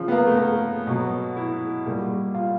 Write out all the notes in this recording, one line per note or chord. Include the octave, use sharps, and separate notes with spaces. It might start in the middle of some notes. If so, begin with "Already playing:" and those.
Already playing: C#3 F3
B3
A#3
A3
A#3
B2 F#3
E4
A#2 G3
F4